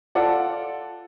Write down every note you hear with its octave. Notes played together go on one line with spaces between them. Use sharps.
F4 A4 D5 F#5